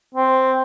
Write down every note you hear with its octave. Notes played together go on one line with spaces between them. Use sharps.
C4